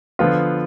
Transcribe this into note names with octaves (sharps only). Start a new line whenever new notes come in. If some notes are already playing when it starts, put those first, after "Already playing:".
D3 F3 B3 F4